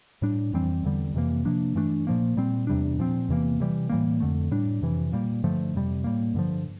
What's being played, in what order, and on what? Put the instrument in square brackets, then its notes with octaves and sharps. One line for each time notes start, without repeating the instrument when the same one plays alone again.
[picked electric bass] A2 G3 D4
F2 E3 G3 C4
E2 D3 G3
F2 C3 E3 A#3
C3 F3 A#3 D4
G2 E3 A3 D4
A#2 F3 A#3
A#2 G3 C4
E2 C3 G3 D4
A#2 F3 C4
E2 C3 E3 A#3
C3 E3 G3
A2 E3 G3 A#3
F2 D3 A3
A2 G3 D4
F2 C3 E3
A#2 G3 A#3
G2 D3 F3 A3
F2 C3 G3
A2 G3 A#3
G2 D3 F3